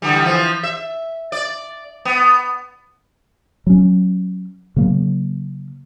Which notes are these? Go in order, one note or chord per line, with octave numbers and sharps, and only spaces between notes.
D3 E3 G3
E3 F3
E5
D5
B3
F#3 C#4
C#3 F#3 A#3